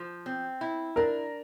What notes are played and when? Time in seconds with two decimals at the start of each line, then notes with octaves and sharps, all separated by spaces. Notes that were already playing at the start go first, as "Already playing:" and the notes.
Already playing: F3
0.26 C4
0.61 E4
0.96 D4 A#4